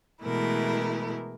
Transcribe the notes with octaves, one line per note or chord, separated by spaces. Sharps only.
B2 E3 G#3 A3 E4 A#4